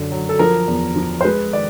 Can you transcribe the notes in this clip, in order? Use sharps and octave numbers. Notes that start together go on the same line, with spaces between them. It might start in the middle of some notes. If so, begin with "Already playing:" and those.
Already playing: F#2 D3
F#3
A4
F3 A#4
E2
F3
C5
G#3 B4
D#3 D5